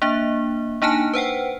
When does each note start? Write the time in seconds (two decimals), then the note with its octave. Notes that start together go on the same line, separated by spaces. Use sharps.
0.02 A#3 D4 E5
0.82 A#3 D4 D#4 G#5 A5
1.14 B4 C5 F#5 G5